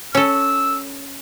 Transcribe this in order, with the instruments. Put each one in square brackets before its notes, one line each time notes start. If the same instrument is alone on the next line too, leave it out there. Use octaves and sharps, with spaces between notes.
[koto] C#4 A4 [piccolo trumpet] E6